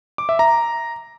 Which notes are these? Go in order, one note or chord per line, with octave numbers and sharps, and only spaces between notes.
D6
E5
A#5